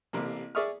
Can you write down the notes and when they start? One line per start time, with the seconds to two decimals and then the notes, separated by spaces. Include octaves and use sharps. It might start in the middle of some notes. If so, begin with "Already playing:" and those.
0.13 A1 C3 A#3
0.55 G#4 D5 E5 C#6 D#6 F6